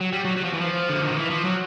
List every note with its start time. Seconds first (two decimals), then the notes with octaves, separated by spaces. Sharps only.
0.01 F#3
0.13 G3
0.25 F#3
0.36 F#3
0.44 F3
0.53 E3
0.61 F3
0.90 D3
1.03 D#3
1.16 E3
1.30 F3
1.44 F#3